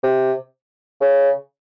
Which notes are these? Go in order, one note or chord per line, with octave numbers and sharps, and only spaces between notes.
C3
C#3